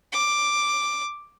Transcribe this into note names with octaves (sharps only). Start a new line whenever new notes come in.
D6